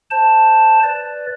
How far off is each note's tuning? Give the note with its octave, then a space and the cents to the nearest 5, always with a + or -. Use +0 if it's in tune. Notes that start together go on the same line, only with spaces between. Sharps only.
C5 +0 A5 +0
B4 +0 D5 +0